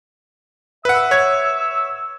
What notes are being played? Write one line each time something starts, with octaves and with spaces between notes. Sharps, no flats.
B4 E5 F#5 E6
C#5 G#6